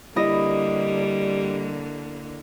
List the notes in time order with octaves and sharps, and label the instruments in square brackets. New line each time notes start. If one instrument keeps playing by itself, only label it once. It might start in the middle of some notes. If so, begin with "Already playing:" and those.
[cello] D3 A#3 [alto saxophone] G3 [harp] E4 D#5